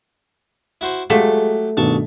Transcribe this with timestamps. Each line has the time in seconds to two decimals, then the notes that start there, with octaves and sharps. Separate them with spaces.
0.81 E4 F#4 C5
1.10 F#3 G#3 A3 G4 F5 B6
1.77 A1 G2 B2 D#3 A5 C#6